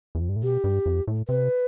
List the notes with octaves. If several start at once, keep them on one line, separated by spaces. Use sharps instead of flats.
E2
F2
G2
A2
B2 G4
G2
F2
A2
C3 B4